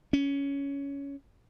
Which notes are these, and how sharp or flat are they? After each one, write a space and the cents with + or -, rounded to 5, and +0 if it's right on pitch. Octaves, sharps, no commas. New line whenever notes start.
C#4 +15